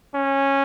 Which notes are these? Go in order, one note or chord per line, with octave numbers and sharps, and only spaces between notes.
C#4